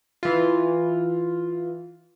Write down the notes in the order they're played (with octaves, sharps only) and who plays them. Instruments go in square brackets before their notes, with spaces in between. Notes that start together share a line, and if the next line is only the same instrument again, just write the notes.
[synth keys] E3 F4